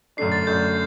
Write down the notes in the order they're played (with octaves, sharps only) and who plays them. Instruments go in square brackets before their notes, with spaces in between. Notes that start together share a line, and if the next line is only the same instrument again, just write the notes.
[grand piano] F#2 D3 A3 D4 [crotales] C7
[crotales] A6
[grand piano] F#2 D3 A3 D4 [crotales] G6